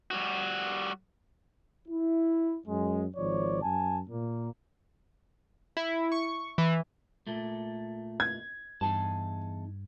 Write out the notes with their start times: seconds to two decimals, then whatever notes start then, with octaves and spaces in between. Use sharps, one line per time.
0.11 G3 F#4
1.88 E4
2.66 F#2 G#3
3.16 G#1 F3 C#5 D5
3.62 F#2 G#5 A5
4.09 A#2 A#3
5.77 E4
6.12 C#6
6.58 E3
7.27 A#2 A3
8.20 G#6
8.81 E2 G2 D#4 A5